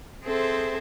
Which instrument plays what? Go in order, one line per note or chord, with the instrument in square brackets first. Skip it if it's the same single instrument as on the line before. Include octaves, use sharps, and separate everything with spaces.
[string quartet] C4 G#4 A4 C5 E5